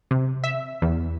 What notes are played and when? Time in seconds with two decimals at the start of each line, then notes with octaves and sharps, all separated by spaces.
0.11 C3
0.44 E5
0.82 E2